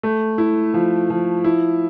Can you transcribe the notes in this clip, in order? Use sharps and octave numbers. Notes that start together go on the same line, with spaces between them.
A3
E4
F3
F3
E4